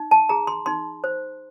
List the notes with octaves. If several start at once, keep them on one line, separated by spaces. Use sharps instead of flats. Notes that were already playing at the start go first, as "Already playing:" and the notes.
Already playing: D#4
A5
G#4 A#5
C6
D#4 C6
C5